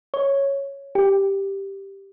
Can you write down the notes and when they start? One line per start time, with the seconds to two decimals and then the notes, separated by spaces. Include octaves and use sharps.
0.14 C#5
0.95 G4